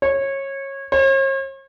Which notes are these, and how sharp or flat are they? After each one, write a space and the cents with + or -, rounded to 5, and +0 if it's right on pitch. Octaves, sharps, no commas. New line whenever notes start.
C#5 -20
C#5 -45